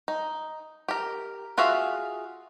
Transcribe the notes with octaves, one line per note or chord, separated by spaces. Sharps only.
D#4
G4 A#4
F4 F#4 G#4 E5 F5